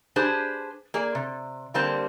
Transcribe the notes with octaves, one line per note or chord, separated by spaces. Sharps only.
D4 G4 G#4 B4 C5 A5
A#3 G#4 D5
C3
D3 G3 A#3 C4 G4 A5